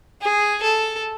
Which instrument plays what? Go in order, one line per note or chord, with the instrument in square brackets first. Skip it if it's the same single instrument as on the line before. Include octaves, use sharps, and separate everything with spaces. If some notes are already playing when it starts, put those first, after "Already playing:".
[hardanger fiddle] G#4
A4